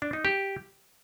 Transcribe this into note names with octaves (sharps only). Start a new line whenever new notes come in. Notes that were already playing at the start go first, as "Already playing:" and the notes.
D4
D#4
G4